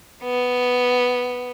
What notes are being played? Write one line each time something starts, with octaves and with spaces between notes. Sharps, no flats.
B3